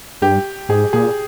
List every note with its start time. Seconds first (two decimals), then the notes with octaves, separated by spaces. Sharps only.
0.22 G2 G4
0.69 G#2 G#4
0.93 A#2 G#4